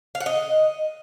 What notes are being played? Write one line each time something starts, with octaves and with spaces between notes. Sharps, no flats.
F5
F#5
D#5